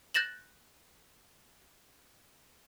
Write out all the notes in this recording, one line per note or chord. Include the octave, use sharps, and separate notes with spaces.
F#6 G6 A6 A#6 E7 F#7